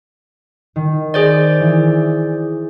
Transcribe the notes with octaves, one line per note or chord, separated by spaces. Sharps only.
D#3
G#4 C5 D5
E3